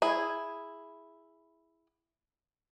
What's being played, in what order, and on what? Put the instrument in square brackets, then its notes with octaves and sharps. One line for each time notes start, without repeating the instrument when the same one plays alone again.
[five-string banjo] E4 G#4